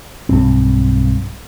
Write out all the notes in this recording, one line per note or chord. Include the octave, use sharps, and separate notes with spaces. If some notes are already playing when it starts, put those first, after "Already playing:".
B1 G2 C4